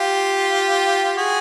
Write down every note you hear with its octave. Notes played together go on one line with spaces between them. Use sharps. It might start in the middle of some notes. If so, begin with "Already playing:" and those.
Already playing: F4 G4
F#4 G#4